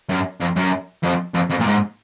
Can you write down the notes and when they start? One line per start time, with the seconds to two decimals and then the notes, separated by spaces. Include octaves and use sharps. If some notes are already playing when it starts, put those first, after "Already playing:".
0.09 F#2
0.40 F2
0.56 F#2
1.03 F2
1.34 F2
1.50 F2
1.60 A#2
1.65 G#2